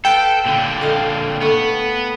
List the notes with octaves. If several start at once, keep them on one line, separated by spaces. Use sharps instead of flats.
A4 B4 F5 G5
A#2 D3
A4 D#5 F5
A3 B3